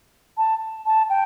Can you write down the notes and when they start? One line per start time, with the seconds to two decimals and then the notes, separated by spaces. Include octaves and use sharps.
0.37 A5
0.86 A5
1.09 G5